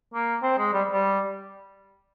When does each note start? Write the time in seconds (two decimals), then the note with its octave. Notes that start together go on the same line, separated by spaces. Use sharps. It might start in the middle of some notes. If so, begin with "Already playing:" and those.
0.14 A#3
0.43 C4
0.58 G#3
0.73 G3
0.92 G3